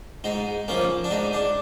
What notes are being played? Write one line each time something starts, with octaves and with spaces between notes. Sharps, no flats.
G#2 D#4
F3 A#3 C#4
D4
G#2 D#4
D4